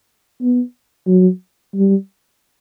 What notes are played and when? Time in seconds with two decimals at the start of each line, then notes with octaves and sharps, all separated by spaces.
0.42 B3
1.07 F#3
1.75 G3